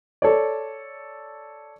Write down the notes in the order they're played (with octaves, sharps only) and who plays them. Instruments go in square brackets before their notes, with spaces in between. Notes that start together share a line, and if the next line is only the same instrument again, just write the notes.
[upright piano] A4 C#5 D5